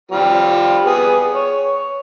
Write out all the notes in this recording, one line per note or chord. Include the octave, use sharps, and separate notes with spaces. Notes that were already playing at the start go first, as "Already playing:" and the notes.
G3 C4 F4
B3 G#4
C#5